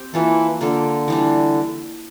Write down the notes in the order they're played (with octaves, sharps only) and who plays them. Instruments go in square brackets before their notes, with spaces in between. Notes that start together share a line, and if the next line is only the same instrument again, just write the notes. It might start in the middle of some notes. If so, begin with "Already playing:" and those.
Already playing: [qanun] C4 G4
[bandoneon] E3 [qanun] A#3 F4 A4
[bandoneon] D3 [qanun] A#3 F4 A4
[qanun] E3 G3 D4